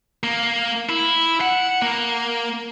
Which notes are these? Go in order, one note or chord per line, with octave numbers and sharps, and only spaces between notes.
A#3
E4
F#5
A#3